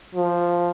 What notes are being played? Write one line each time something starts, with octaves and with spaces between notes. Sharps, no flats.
F3